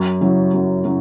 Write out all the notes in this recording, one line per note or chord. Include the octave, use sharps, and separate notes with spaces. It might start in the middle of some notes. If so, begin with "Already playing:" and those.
Already playing: F#2
C#3 F#3 C#4 E4
F#2
C#3 F#3 C#4 E4